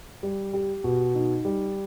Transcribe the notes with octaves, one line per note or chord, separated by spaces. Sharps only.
G3
G4
B2
D#4
G3